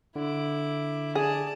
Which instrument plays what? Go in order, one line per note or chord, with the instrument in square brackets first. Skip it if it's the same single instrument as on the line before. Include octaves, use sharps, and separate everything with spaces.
[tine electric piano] D3 [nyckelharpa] E4 D6
[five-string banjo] G#4 [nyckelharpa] D5 A5